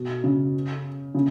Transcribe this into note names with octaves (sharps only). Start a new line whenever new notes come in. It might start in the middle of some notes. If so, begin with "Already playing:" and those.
Already playing: B2
C#3
C#3